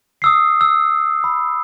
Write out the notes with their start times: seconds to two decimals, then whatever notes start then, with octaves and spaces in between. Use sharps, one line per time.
0.22 D#6 E6 C7
0.61 E6
1.24 B5